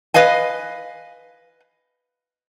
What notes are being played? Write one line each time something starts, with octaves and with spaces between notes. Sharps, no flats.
B4 D#5 F5 G#5